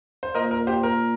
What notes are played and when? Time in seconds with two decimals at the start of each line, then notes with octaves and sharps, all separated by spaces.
0.23 C5
0.35 A#2 A#4 D#5
0.51 A#4
0.67 G4 C5
0.83 A#4